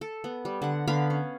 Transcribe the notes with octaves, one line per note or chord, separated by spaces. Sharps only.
A4
B3
G3
D3 F#5
D3 B3 F5 B5
C#4